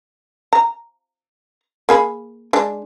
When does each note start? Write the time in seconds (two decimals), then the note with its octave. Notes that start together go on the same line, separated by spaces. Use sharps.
0.53 A#5
1.89 A#3 G#4 B5
2.53 G#3 D4